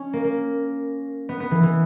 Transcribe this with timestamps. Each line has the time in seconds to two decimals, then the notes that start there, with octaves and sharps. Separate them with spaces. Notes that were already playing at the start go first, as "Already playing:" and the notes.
Already playing: C#4
0.13 A#3
0.24 A#3
1.29 B3
1.40 B3
1.51 E3
1.63 E3